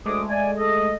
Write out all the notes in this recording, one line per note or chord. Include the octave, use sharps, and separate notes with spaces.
D2 G#3 A3 D6 D#6
D5 G#5
A4 D#5